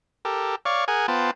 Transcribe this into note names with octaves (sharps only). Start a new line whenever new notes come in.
G4 A4 A#4
C#5 D5 F5 C#6
G#4 A#4 F#5 G#5
B3 F4 C5 G5 A5